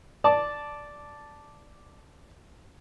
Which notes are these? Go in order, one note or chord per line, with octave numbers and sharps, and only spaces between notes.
D5 A5 D6